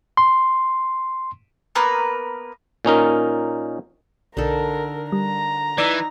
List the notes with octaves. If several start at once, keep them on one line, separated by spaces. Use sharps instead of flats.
C6
A#3 B3 A#4 B4
A#2 C#4 D#4 A#4
B1 D3 D#4 A4 A#4
G3 A#5
E3 D#4 D5 E6